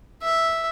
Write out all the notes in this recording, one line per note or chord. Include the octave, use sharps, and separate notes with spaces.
E5